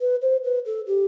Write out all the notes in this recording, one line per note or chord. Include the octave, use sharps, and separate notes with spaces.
B4
C5
B4
A4
G4